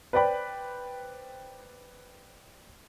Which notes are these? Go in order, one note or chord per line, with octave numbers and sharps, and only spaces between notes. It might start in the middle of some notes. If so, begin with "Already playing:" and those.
B4 C5 D5 G5 B5